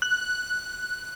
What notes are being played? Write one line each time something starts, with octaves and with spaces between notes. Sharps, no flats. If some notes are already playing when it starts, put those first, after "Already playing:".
F#6